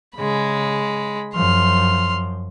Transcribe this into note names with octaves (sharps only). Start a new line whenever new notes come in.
C#3 G#3 B5
F#2 F3 C6 F6